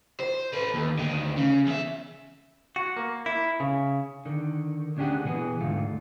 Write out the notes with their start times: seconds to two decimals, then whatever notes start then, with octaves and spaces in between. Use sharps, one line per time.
0.20 C5
0.53 A4 B4
0.74 D#2
0.99 D2 D#3
1.37 C#3
1.66 E2 E5
2.76 F#4
2.97 A#3
3.26 E4
3.60 C#3
4.25 D3 D#3
4.97 D2 C#4 D4 G4 G#4 F#5
5.24 B2 E3 B3 G#4
5.61 D2 G#2 A3 F4